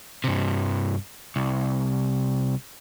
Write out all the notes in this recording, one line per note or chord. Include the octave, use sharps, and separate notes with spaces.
G2 C3
C2